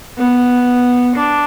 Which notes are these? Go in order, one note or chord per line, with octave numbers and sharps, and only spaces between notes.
B3
D4